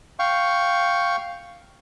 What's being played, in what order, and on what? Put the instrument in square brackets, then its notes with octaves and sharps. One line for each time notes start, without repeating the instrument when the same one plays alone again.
[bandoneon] F5 G5 C#6